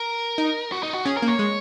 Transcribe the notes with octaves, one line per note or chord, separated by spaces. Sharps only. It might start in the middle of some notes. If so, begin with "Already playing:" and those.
Already playing: A#4
D#4
F#4
D#4
F#4
C#4 G#4
A#4
A#3
C#5
G#3